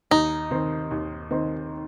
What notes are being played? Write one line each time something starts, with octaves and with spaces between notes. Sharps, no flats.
D#2 D#4
D#3 C4
D#2
D#3 C4